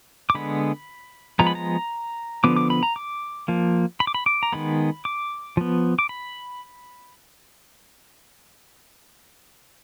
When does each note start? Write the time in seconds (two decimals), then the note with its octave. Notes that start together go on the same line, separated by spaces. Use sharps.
0.30 D6
0.35 D3 G#3 B3 B5
1.39 F3 G#3 B3 A#5
1.47 B5
1.55 A#5
2.44 D3 F3 B3 D6
2.56 D6
2.70 B5
2.83 A#5
2.96 D6
3.48 F3 A#3
4.00 B5
4.07 D6
4.14 B5
4.26 D6
4.43 A#5
4.53 D#3 G#3 B3 B5
5.05 D6
5.57 F3 B3
5.99 D6
6.09 B5